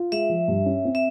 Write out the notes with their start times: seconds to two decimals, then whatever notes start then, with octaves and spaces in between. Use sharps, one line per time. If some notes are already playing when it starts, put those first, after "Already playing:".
Already playing: F4
0.12 G#3 E5
0.29 F3
0.48 G2
0.66 C#4
0.85 C4
0.95 E5